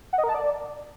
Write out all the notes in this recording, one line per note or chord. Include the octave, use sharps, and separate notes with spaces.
F#5
D#5
A#4
A5
D5